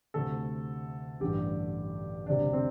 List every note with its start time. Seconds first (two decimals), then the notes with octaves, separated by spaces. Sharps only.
0.14 D2 C3 A3 A4
1.20 A1 G2 D3 A3 G4
2.26 E1 D2 C3 G3 D4
2.53 C4